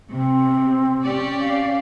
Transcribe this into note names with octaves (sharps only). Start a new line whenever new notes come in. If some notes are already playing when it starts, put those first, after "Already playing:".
C3 C4
C#4 G4 D5
F5